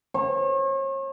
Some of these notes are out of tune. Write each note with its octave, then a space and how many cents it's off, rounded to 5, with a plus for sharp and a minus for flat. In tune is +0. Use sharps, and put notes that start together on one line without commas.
C#5 -40